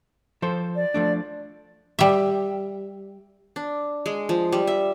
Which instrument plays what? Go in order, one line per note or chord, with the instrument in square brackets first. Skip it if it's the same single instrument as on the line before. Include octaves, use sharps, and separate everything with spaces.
[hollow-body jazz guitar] F3 A4 C5
[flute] D5
[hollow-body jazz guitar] F3 A3 D4
[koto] G3 E5
[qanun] D4
G#3
F3
G3
E5